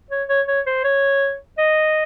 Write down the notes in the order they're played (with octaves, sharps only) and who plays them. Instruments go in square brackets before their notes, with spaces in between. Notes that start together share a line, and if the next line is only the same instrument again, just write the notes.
[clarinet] C#5
C#5
C#5
C5
C#5
D#5